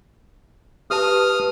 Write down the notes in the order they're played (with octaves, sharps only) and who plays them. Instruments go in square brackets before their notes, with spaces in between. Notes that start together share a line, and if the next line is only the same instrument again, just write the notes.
[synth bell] G4 B4 A5 [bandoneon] D#6 F6